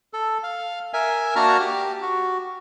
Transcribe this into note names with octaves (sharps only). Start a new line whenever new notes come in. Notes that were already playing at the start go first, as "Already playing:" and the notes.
A4
F5
A#4 E5 G#5
A#3 D4 F#4 A5 A#5 F6
G4
F#4